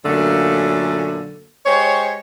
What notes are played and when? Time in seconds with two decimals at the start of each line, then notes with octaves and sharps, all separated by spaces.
0.06 F#2 A#2 D3 F#3 A3 A#3
1.66 G#3 G4 C5 C#5